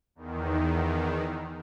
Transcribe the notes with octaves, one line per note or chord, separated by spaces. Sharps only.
E2 D#3